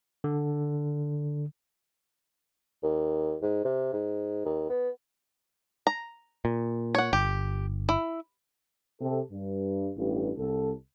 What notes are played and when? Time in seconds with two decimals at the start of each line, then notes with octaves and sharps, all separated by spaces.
0.24 D3
2.83 D#2
3.42 G#2
3.65 C3
3.93 G#2
4.45 D#2
4.69 B3
5.87 A#5
6.45 A#2
6.95 C#5 F#5
7.13 G1 G4
7.89 E4
9.02 C3 A4
9.31 G2
9.97 A1 G2
10.37 C2 A4